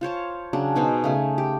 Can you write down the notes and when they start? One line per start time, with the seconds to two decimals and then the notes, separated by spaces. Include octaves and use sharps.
0.01 F4 C5 C#5 A5
0.53 C#3 F#3 D4
0.75 B2 D#4 G#4 C5
1.04 C#3 A3 G#5
1.38 G4